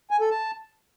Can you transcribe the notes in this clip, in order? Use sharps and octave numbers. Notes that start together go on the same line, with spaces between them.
G#5
A4
A5